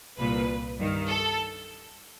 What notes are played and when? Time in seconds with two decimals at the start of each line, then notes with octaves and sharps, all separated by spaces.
0.18 C2 A#2 B4
0.78 G2 D#3
1.08 A4